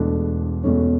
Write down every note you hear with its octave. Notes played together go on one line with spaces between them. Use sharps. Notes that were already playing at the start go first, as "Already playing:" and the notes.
Already playing: E1 E2 B2 A3 D4
E1 E2 B2 A3 C#4